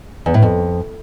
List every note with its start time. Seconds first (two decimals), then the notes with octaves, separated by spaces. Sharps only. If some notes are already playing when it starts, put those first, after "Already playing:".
0.26 E2
0.34 A2
0.42 F2